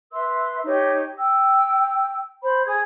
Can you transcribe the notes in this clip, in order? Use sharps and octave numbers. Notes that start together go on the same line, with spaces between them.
B4 E5 C6 E6
D#4 G4 C#5
G5 E6
C5 B5
G#4 D#6 G#6